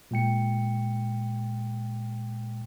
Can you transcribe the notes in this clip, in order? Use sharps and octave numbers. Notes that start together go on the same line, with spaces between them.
A#2 G#3 G5 C#7